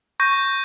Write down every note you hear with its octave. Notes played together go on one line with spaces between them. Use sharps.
C#6 G6 A#6